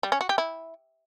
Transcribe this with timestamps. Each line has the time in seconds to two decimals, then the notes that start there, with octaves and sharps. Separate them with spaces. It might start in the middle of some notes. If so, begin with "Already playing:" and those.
0.03 G3
0.12 C#4
0.21 F#4
0.29 G4
0.38 E4